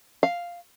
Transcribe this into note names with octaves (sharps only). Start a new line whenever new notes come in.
F5